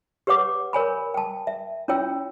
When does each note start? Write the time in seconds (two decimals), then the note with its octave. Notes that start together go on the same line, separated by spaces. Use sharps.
0.27 G4 B4 C#5 F#5 D6
0.73 A#4 C#5 G#5 B5
1.14 G5 A5
1.47 E5
1.88 C#4 E4 F4 C#5 G5 E6